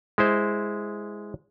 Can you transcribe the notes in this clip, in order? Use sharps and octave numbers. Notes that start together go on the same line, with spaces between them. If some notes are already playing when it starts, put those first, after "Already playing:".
G#3 E4 C5